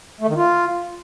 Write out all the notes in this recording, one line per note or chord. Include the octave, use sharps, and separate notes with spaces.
A3
D#3
F4